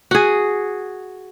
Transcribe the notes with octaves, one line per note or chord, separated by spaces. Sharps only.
F#4 G#4